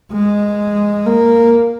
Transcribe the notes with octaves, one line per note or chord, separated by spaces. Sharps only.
G#3
A#3